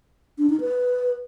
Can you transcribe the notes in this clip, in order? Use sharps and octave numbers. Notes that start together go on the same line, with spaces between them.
D4
D#4
B4